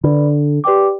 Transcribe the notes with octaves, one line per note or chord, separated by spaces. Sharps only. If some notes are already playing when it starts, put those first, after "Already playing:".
D3 B4 D5 B5
G4 B4 D5 G5 D6